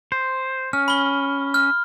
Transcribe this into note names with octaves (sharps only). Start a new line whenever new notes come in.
C5
C#4 F6
B5 G7
F6